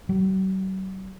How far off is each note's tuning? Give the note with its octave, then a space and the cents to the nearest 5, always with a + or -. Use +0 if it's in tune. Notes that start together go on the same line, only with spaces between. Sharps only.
F#3 +45